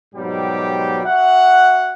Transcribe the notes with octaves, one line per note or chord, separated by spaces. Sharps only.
G#2 B2 F#3 G3 G4
F#4 E5 F#5